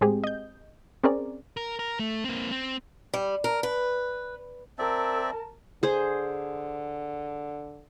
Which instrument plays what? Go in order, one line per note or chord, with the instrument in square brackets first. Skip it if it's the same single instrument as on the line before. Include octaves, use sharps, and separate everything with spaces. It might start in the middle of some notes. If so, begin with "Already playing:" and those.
[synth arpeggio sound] A2 G#3 C4 G4 G#4
D#5 G6
C4 C#4 G#4 A#4 D5
[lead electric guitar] A#4
A#4
A3
A#3 C4
C4
[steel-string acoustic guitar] G3
A#4
B4
[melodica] C4 D5 E5 [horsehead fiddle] A#4 A5
[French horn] D3 [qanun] G#4 C5